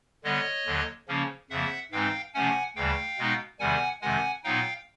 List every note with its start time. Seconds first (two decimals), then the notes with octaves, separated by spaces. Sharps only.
0.24 D3 G3 B3 C#5 D#5
0.66 D#2 D3 F#3
1.08 C#3 F3 A#3 C#4
1.50 F2 C#3 F3 A#3 E5 F#5
1.92 G#2 E3 G#3 C4 D#4 F5 G5
2.34 C3 F3 A3 C#4 F#5 G#5
2.76 D2 C#3 E3 G3 F5 G5
3.18 B2 G#3 B3 D#4
3.60 E2 C3 D#3 G3 F#5 G#5
4.02 F2 C3 D#3 G#3 F#5 G#5
4.44 A#2 F#3 B3 D#4 F5 G5